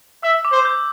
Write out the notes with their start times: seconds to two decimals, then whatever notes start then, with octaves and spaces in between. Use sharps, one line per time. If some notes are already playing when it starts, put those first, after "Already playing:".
0.23 E5 E6
0.45 D6
0.52 C5
0.65 G6